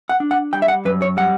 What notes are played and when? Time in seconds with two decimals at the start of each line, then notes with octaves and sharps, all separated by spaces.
0.09 F#5
0.20 D4
0.31 F#5
0.53 G3 G5
0.62 E5
0.68 F#5
0.85 F#2 B4
1.02 C#5
1.17 G3 F#5